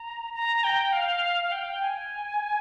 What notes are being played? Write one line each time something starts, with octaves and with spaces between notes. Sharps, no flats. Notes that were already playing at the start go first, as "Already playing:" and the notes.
Already playing: A#5
A#5
G5
F5
F5
G5
G#5